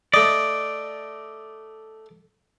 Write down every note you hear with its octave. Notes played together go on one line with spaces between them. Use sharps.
A3 D5 D#5